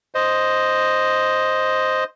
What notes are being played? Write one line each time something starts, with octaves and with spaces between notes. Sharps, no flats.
C5 D#5